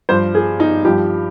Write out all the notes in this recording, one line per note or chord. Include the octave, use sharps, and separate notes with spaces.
G2 F3 C5
G#4
D#4
G2 F3 G4